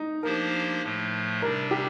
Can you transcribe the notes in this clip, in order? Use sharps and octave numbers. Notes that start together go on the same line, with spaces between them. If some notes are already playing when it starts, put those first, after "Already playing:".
Already playing: D#4
F3 A#3 D4 G4 A#4 C5
A2 F3 A3
C3 G3 D4 A#4
G4